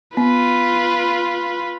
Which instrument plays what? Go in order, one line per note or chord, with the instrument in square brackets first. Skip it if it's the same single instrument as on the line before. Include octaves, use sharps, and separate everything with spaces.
[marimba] B3 [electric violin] F4 B4